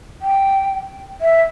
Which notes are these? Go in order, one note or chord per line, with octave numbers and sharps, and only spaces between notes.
G5
E5